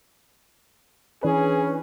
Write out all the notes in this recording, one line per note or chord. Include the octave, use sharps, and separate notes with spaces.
E3 C#4 D4 G#4 B4